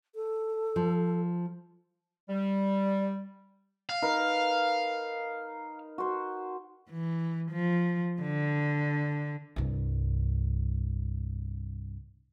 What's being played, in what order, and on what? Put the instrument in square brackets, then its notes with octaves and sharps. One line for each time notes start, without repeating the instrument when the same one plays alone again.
[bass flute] A4
[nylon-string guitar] F3
[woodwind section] G3
[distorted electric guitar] F5
[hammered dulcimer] D#4 A#4 B4
F#4 C5
[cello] E3
F3
D3
[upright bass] C2 G2